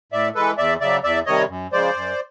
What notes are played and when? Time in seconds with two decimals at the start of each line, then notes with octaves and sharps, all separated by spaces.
0.12 A2 D5 E5
0.35 E3 G#3 A4 B4
0.58 E2 D5 E5
0.80 C#3 F#3 D5 E5
1.03 E2 D5 E5
1.26 C3 D#3 G3 C#5 D#5
1.49 F#2
1.72 C#3 F3 G#3 C5 D5
1.95 F#2